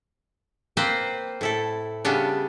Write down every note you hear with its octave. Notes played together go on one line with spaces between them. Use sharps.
A#3 C4 B4 C5 G5
A2 E4 A4
C#3 G3 B3 D4